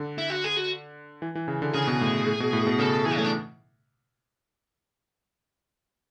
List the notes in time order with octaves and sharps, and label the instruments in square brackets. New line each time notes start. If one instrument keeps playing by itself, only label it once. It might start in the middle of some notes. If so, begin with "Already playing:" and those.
Already playing: [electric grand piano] D3
[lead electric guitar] E4
F#4
G#4
F#4
[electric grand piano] E3
E3
C#3
D3
[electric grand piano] C#3 [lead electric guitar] G#4
[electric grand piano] B2
A2
A2
B2
A2
B2
[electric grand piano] C#3 [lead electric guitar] A4
[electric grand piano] E3 [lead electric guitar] G#4
[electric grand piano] A3 [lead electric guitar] C#4
[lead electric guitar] D4